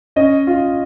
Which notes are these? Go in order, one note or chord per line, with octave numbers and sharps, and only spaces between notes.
C#4 D#5
F4